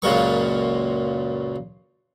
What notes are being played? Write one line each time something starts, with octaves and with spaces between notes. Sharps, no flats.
C#2 F#2 A#2 A#3 C#6